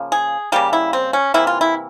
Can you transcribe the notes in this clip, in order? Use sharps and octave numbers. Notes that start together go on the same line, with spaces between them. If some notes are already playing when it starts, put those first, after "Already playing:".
Already playing: C#3 F3 A#3
G#4
C#3 G3 A#3 G4
E4
C4
C#4
C3 E3 A#3 E4
F4
E4